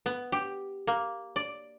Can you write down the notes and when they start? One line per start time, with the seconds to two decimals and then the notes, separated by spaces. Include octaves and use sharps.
0.06 B3
0.32 G4
0.87 A#3
1.36 D5